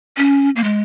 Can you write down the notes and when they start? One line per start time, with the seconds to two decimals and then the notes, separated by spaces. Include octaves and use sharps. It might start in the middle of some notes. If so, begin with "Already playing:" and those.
0.17 C#4
0.56 A#3
0.64 G#3